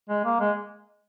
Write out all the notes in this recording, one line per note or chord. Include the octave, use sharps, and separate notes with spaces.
G#3
A#3
G#3